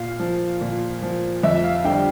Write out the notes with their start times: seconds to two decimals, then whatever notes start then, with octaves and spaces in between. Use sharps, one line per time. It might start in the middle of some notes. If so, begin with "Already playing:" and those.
Already playing: A#2 F5
0.20 F3
0.61 A#2
1.02 F3
1.43 F2 E5
1.64 F5
1.84 D3 G3 E5 G5